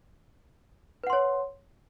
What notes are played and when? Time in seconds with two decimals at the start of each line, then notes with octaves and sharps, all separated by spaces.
1.04 B4
1.07 F#5
1.10 C6
1.13 C#5